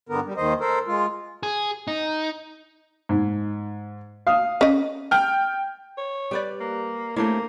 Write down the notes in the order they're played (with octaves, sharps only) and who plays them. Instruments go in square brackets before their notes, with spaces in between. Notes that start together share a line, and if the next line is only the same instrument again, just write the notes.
[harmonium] G2 D3 B3 A#4
G3
D#2 D#3 C5 D#5
A4 A#4 C5
G#3 F4
[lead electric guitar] G#4
D#4
[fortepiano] G#2
F5 D#6
[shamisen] C#4 D#5
[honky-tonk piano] G5 F6
[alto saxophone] C#5
[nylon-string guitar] G3 [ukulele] G4 B4 D5
[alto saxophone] A#3
[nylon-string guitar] A3 C4 E4 [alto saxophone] A#3 [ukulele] D4 G4 C#5